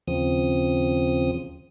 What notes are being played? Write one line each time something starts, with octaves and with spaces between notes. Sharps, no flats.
D#2 C#3 F3 C4 D#6